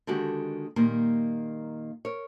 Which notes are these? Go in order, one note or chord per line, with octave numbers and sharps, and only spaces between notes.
D3 D#3 G#3 F#4 G4 A4
A#2 D#3 G3 A#3
A#4 C#5